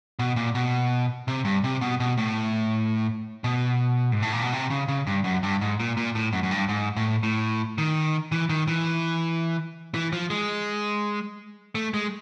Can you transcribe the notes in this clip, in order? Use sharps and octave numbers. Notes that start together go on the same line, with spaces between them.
B2
A#2
B2
C3
G2
C3
B2
B2
A2
B2
G#2
A2
A#2
B2
C3
C#3
C#3
G2
F#2
G2
G#2
A#2
A#2
A2
F#2
F#2
G2
G#2
A2
A2
D#3
E3
D#3
E3
E3
F3
G#3
A3
G#3